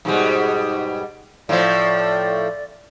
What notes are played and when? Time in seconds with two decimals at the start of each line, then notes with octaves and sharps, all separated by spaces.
0.05 G#2 B2 G3
1.49 A2 F3 D5